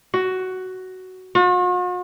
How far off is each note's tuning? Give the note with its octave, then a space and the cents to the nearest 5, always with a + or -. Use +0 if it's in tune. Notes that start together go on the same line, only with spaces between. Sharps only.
F#4 +10
F#4 -45